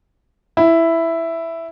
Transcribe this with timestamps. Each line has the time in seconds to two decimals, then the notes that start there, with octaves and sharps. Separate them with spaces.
0.57 E4